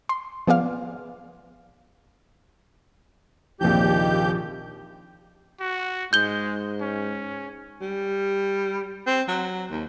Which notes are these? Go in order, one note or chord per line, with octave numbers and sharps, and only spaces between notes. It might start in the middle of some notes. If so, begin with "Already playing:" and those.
C6
F3 B3 G#4 D5 F5
A#1 D#2 C3 F3 G4 G6
F#4
G#2 G#3 G6 G7
C#4
G3
C4
F#3
D#2